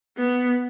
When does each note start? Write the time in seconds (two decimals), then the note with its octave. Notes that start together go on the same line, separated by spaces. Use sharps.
0.17 B3